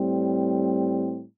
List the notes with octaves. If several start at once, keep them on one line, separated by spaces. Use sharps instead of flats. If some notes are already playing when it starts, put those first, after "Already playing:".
Already playing: A2 G3 C4